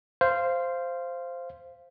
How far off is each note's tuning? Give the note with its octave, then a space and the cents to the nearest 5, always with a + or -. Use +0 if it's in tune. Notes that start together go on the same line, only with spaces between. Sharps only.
C5 +0 F5 -15